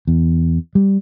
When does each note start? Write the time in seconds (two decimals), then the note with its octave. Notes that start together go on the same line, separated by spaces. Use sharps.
0.07 E2
0.75 G3